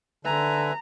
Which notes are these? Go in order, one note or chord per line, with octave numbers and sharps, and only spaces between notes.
D3 B4 E5 G#5 A#5